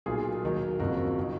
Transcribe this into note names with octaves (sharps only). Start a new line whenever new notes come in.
B1 A#2 F#3 F4 G#4
D#2 D#3 F#3
F#1 F2 F3 F#4 A#4
D#3 F#3